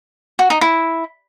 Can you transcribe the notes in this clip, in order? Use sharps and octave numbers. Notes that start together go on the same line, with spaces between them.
F#4
D#4
E4